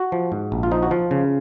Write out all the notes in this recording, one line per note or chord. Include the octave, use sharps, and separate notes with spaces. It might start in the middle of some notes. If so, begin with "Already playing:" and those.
Already playing: F#4
F3
G#2
A#1
F4
F3 D#4
F#4
F3 F4
C#3